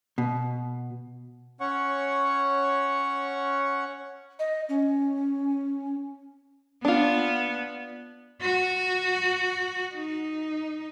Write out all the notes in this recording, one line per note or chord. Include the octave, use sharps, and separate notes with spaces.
B2
C#4 C#5 F#5 C#6
D#5
C#4
B3 D4 F4
F#4
D#4